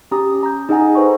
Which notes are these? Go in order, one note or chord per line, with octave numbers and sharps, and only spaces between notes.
C#4 G4 A#5 D#6
A#5 G6
D#4 G#4 D#5 F#5 G#5 A#5
A4 B4 C5 G5 C#6